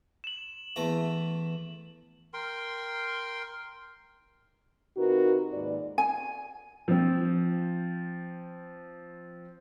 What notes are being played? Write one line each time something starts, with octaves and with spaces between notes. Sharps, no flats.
E7 F#7
E2 A3 A#5
A#4 G5 C6
C3 D#4 F4 F#4 A#4 B4
D#2 G#2 B4 D5
G#5
F3 C4